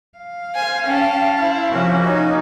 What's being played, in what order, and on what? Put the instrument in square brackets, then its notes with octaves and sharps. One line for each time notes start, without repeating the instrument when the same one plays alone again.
[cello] F5
[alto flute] C5 [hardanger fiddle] G#5
[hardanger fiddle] C#4 A5 [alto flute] G5
[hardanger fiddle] E4 [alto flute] C5
[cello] C3 F3 [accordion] A#3 C#4 F#4
[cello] D#4 [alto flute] C#5